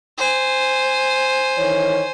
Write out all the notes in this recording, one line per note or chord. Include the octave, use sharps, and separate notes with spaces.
C5 G#5
D#3 E3 C#5